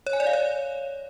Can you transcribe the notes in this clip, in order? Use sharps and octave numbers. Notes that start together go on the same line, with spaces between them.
C#5
G#5
D5
F5
C#5